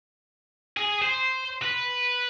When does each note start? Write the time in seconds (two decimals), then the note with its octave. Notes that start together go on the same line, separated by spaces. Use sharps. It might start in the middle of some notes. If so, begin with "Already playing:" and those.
0.77 G#4
1.02 C5
1.62 B4